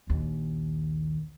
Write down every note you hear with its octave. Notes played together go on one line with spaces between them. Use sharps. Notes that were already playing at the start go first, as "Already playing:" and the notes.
A#1 D#2